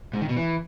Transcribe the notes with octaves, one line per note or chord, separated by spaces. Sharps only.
G#2
D#3
B2
E3